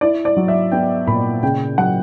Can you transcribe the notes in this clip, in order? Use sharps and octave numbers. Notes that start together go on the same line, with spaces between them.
E4 D5
D5
F#3
E5
B3 G5
A#2 B5
C#3 G5
F#3 F#5